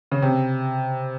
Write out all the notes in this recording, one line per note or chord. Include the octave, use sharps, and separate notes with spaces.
C#3
C3